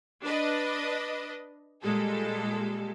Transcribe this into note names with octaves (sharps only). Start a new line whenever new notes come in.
D4 B4 D#5
A#2 G3 G#3 A4